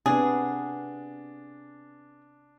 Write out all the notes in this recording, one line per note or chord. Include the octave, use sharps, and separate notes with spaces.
C3 B3 D4 G#4